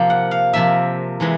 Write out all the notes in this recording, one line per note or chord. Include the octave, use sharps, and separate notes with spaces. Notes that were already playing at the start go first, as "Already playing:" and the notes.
Already playing: C3 F3 A#3
F#5
F5
C3 F3 A#3 E5
C3 E3 G#3